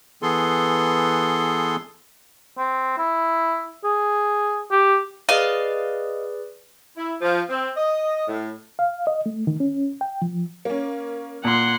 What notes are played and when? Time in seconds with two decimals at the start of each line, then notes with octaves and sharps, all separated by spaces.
0.22 E3 B3 G#4 A4 C6
2.58 C4
2.98 E4
3.84 G#4
4.71 G4
5.29 G#4 B4 D5 D#5 F5
6.97 E4
7.21 F3
7.50 C4
7.76 D#5
8.28 A2
8.79 F5
9.07 D#5
9.26 A3
9.47 D#3
9.60 C#4
10.01 G5
10.22 F3
10.65 A#3 C#4
11.44 A#2 F#5 C6